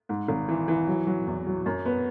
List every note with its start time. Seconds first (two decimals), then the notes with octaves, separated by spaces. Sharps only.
0.09 G#2
0.28 G#1
0.48 E3
0.68 E3
0.87 F#3
1.07 F#3
1.27 E2
1.47 F#3
1.66 F#2
1.85 B3